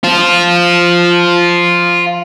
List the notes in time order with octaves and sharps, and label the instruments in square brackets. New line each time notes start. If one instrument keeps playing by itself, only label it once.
[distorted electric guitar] F4 C5